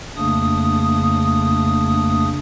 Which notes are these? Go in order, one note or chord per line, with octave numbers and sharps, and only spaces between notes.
F2 C#3 A3 A#3 D4 D#6